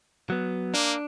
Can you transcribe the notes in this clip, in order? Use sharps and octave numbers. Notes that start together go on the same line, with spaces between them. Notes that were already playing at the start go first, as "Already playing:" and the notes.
F#3 B3
A#3 D4